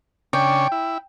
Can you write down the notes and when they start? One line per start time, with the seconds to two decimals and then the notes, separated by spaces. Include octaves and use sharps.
0.33 C#3 D4 C#5 G5
0.72 E4